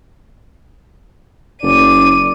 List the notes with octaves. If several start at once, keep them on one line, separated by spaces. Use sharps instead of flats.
F#1 D5 D#7